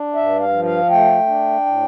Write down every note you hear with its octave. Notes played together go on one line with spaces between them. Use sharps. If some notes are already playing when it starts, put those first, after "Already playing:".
Already playing: D4
G2 E5
F5
F3
F5
A3 G5
D4
A2